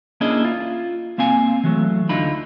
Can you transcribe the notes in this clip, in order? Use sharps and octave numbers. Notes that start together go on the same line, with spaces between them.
A#3 C#4 D4 E4 G#4 D#5
F4
A#3 C4 F5 G#5
E3 F#3 A3
D2 D3 D#4 F4 B5